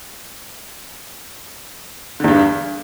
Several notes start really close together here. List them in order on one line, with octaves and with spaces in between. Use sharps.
D3 E2 G2